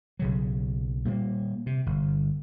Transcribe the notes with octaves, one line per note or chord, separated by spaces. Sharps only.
B1 C#3 F#3
A#2 G3 A3 A#3
C3
G1